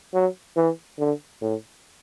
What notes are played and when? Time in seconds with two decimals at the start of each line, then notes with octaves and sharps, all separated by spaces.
0.14 F#3
0.56 E3
0.99 D3
1.42 A2